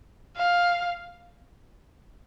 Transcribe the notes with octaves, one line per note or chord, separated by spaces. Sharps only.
F5